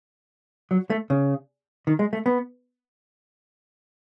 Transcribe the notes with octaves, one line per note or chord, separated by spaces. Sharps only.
F#3
A3
C#3
D#3
G#3
A3
B3